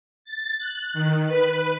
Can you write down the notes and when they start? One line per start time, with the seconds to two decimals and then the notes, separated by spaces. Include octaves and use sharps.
0.25 A6
0.59 F#6
0.94 D#3
1.28 B4